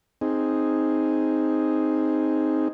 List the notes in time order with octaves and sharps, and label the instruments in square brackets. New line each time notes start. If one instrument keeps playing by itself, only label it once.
[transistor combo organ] C4 D#4 G#4